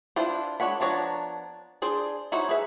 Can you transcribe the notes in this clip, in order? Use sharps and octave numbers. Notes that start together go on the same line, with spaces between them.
D4 E4 F4 B4 C5
G#3 D4 C#5 F#5 B5
F3 B3 D4 C#5 A#5
D4 G#4 C5 D5
D#4 E4 F#4 C5 C#5
G#4 B4 E5